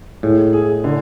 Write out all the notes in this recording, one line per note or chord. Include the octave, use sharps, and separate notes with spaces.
A2 G#3
G#4
D3